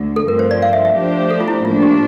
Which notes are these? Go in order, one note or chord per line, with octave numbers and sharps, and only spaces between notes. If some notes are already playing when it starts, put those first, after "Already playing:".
Already playing: D2 D3
A4
G2 F3 A3 C4 A#4
C5
D5
F5
E5
E5
F3 A3 D4 G4 C5
A4
F4
E4
A2 F3 A#3 D4 F4
G4